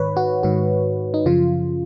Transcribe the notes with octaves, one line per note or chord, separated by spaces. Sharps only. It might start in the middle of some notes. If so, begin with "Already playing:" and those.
Already playing: G#2 D#3 B4 C#5
F#4
G#2 D#3 F#4
D#4
F#2 C#3 F3 F4